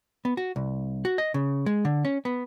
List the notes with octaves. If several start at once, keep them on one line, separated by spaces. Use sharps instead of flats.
B3
F#4
C2
F#4
D#5
C#3
G#3
D3
C#4
B3